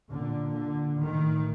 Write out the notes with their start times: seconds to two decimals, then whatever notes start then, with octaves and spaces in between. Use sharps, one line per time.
0.10 A#2 D3
0.55 D3
1.00 A2 D#3